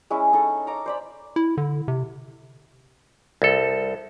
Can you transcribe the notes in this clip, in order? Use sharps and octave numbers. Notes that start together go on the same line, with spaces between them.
G#3 C#4 E4
D#4 A4 A5
A#5 D6
C5 D5 B5
E4
D3
C3
C2 A4